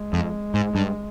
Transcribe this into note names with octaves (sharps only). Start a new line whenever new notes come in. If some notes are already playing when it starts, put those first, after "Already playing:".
Already playing: G#3
F2
G#2
G2